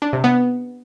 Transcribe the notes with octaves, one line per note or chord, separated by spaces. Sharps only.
D4
C3
B3